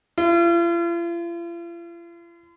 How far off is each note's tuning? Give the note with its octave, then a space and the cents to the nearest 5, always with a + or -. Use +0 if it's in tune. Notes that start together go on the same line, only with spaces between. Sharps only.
F4 -45